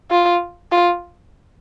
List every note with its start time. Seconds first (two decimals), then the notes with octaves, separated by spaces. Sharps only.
0.11 F4
0.72 F4